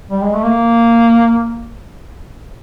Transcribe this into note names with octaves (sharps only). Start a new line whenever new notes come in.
G3
G#3
A3
A#3